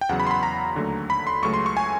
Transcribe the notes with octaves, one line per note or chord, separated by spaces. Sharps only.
G5
E2 C#3 F#3 F#5
B5
C6
B5
A#5
D#2 D3 F#3 A3
B5
C6
C#2 C#3 F#3 A3 C#6
C6
C#6
G#5